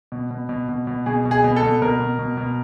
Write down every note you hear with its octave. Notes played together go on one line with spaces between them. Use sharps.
B2
B2
B2
B2
B2
B2 G#4
B2
G#4
B2
A4
B2
B2 A#4
B2
B2
B2